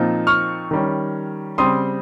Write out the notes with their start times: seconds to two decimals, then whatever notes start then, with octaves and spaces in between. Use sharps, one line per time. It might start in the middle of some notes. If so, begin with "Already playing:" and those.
Already playing: A#2 F3 C4 D#4
0.27 C#6 F6
0.71 D#3 G3 C#4
1.58 C#3 G3 C4 C6 D#6